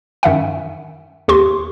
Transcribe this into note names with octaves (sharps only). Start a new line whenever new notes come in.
F#2 D#3 E5 F#5
D#2 G4 C6